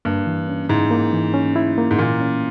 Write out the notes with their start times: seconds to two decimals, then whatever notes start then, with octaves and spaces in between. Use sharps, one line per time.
0.05 G2 A#3
0.27 E3
0.48 C#4
0.69 G#2 E4
0.91 A#3
1.13 E3
1.34 C#4
1.56 E4
1.78 A#3
1.91 G#2
1.98 A#2 E3
2.21 C#4